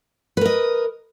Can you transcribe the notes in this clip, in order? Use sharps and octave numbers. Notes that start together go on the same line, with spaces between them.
A#4 B4 D#5